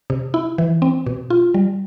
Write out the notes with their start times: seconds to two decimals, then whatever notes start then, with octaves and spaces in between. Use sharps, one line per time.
0.10 C3
0.34 E4
0.58 E3
0.82 C4
1.06 B2
1.30 F4
1.54 G3